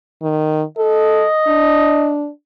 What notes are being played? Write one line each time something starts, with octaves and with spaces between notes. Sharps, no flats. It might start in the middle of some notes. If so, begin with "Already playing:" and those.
D#3
A4 D#5
D4